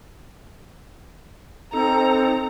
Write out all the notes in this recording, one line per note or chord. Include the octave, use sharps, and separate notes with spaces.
C4 D#4 A4 A#5